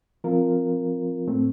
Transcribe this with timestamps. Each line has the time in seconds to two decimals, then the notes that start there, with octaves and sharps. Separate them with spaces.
0.24 F3 C4 F4 A#4
1.27 A2 A3 C4